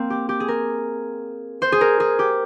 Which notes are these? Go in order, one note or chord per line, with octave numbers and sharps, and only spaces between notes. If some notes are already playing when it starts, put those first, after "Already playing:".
Already playing: A#3 C4
G4
G4
G#4
A#4
C5
G#4
A#4
G#4
G4